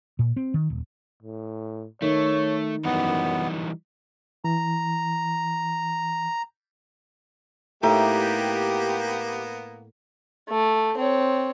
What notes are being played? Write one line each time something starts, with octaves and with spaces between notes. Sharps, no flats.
A#2
C4
D#3
D#1
A2
D#3 A3 C#5
F#2 E3 G3 B3 D#4
E3 A#5
A2 A#3 B3 D#4 G4
A3
C4 C#5